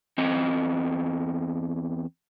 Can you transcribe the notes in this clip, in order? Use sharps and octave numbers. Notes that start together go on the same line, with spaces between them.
E2 C4 D#5